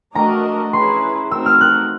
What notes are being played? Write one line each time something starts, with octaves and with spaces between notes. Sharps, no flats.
A3 D4 F#4 A#4 D#5 A#5
C#4 E4 G#4 B4 C6
A3 C4 D#4 F#4 A#4 E6
F6
F#6